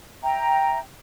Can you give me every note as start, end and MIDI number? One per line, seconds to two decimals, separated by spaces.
0.23 0.79 76
0.23 0.79 79
0.23 0.79 82